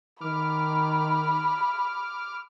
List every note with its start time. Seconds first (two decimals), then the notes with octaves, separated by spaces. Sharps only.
0.21 D#3 B5 D6 F6